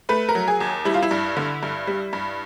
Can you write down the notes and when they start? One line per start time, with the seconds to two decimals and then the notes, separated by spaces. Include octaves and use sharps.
0.09 A3 B4
0.29 A#4
0.35 F#3
0.48 G#4
0.60 D#2
0.85 G3 E4
0.94 F4
1.02 E4
1.11 G2
1.37 D3
1.63 G2
1.87 G3
2.13 G2